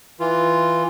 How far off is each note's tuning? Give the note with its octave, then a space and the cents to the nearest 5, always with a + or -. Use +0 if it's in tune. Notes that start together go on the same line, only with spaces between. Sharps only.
E3 +0 F4 -10